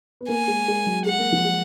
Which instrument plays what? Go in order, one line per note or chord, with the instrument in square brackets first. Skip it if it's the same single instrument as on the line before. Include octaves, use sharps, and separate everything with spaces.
[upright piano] B3
[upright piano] A#3 [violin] G#5
[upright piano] G#3
G#3
F#3
[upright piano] G#3 [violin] F#5
[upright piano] A#3
F3
G#3